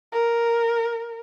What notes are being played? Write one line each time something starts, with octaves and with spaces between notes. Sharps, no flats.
A#4